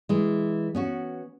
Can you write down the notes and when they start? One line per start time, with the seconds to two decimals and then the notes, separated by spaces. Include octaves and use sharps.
0.09 E3 G#3
0.75 B3 C#4 F#4